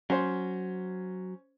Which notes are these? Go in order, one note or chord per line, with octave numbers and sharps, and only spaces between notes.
F#3 C#4 C5